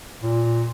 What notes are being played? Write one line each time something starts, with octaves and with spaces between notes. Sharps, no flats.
A#2